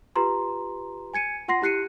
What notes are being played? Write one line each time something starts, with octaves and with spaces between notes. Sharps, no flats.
F4 G4 B4 A#5 C6
G#5 G#6 C#7 D#7
F4 F#5 C6 A#6 C7
E4 G4 F#6 C7 C#7 D#7